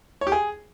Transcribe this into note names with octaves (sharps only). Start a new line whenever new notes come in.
C#5
G4
G#4